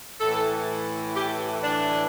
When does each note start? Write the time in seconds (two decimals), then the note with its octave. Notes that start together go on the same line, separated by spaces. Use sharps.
0.21 A2 E3 A4
1.16 G4
1.63 D4